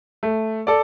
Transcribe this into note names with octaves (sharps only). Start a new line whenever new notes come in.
A3
A4 D5